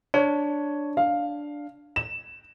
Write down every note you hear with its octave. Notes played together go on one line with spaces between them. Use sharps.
D4 C#5
F5
E7